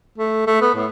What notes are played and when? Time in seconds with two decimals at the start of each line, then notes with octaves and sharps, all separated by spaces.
0.18 A3
0.47 A3
0.61 B3
0.75 A2